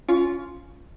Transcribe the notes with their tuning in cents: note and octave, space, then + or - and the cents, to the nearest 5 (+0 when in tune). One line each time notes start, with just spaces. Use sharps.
C#4 +15 F4 +0 C#6 +25